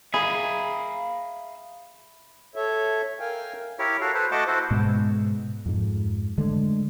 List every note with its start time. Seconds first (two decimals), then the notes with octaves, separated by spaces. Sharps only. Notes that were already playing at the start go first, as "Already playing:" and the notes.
0.14 G#4 E5 F5 A#5 B5
2.55 A4 C#5 E5
3.20 A#4 F5 G5 G#5
3.79 E4 G4 A#4 C#5
4.01 F#4 A4 F5
4.14 A4 B4 C5
4.31 A3 F#4 D#5 F#5 A5 D6
4.47 E4 F#4 A4 C5
4.70 G#2 B2 G#3
5.66 F2 G#2
6.38 D3 G#3 A3